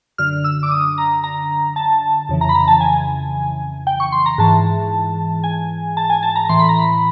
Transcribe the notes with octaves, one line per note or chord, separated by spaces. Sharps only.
F#2 D3 F6
E6
D6
D#6
A#5
A#5
A5
F2 C#3 E3
A#5
B5
A#5
A5
G#5
G5
C#6
C6
A#5
G#2 E3 A5
G#5
A5
G#5
A5
A#5
A2 E3 C6
B5
A#5
B5